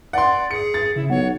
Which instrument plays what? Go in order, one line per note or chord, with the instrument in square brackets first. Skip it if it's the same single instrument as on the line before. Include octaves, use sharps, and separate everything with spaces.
[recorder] D5 [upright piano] F#5 C6
[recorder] G#4 [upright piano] C#7
[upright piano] A6
[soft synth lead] C#3 [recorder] E4
[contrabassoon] B1 [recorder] C#5 [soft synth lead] F#5